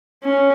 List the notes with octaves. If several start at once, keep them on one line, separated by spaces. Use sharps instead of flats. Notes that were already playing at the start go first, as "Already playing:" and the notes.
C#4